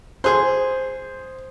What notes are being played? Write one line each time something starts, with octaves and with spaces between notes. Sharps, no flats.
G#4 C5 C6